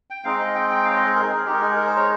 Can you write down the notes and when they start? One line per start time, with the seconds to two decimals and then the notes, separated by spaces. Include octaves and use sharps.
0.10 G5
0.24 G#3 C4 D#4 F5
0.39 D#5
0.55 G5
0.70 G5
0.85 F5
0.91 C#5
0.95 D#5
1.05 G#4
1.16 A#4
1.31 G#4
1.46 G#3 D#4 G4
1.54 A#4
1.61 G#4
1.76 A#4
1.87 C5
1.97 C#5